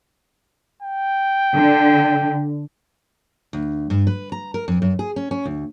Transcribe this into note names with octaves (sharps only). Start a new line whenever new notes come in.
G5
D3
D2
G2
B4
A#5
A#4
F2
F#2
G#4
C#4
C#4
D2